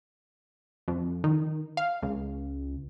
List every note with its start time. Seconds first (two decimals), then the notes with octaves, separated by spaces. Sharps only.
0.88 F2
1.24 D#3
1.77 F5
2.02 C#2